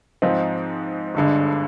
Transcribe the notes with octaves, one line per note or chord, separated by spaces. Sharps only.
G#2 F3 C4 D#4
G1 G2 D3 G#3